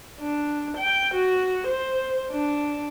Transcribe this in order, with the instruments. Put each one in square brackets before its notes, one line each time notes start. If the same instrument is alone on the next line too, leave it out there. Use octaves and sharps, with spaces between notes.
[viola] D4
G5
F#4
C5
D4